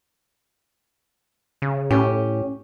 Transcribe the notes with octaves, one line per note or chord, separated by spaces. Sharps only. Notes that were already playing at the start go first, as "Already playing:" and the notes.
C#3
A2 C#4 G4